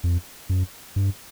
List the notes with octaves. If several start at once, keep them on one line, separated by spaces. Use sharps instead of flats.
F2
F#2
G2